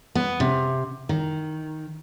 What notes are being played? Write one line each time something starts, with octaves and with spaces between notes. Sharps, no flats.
B3
C3
D#3